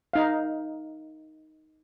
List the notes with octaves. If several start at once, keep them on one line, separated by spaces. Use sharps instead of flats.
D#4 F5